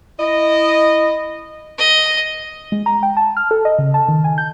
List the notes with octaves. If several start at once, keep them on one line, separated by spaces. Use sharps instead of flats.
E4 D#5
D#5
G#3
A#5
G5
A5
F6
A4
D#5
C#3
A5
D#3
G#5
G6